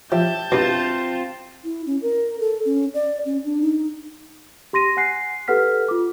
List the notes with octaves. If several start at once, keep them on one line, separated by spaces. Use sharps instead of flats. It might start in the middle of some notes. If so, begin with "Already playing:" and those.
F3 G4 E5 A5 G6
G2 B2 C4 F4
E4
C#4
A#4
A4
C#4
D5
C#4
D4
D#4
G4 C6 A#6 D#7
F#5 G#5 F#6 C7
G4 A4 B4 F#5 F6 B6
F4 D6